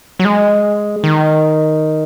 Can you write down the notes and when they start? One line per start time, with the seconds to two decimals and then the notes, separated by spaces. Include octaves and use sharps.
0.20 F#3
0.25 G#3
1.04 D#3